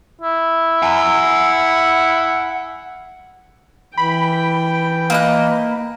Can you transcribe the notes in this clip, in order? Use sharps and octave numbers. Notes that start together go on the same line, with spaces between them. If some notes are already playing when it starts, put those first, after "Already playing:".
E4
F#5 G#5
E3 G5 B5
A#3 D#4 F#6